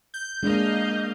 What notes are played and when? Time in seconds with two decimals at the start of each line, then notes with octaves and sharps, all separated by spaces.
0.14 G6
0.43 G#3 A#3 D4 D#5 F5